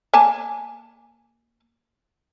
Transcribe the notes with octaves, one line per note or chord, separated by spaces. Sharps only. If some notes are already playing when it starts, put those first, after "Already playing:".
A#3 G#5 A5